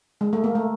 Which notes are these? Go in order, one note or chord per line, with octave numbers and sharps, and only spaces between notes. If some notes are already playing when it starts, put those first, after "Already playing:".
G#3
A3
A#3
A3